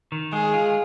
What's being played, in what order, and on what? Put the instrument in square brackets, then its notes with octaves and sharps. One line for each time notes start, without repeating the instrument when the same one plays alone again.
[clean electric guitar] D#3
[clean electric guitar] G#3 [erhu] G#4
[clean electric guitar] F4